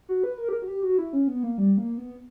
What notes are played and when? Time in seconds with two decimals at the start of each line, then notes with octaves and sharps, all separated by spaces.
0.09 F#4
0.24 B4
0.38 A#4
0.49 G4
0.53 A#4
0.62 F#4
0.68 G4
0.83 F#4
0.98 E4
1.13 C#4
1.28 B3
1.43 A#3
1.58 G3
1.78 A#3
1.98 B3